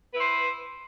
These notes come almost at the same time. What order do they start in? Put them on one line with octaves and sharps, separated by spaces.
B4 E4 C5